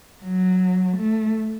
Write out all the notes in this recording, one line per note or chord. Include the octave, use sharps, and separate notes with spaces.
F#3
A3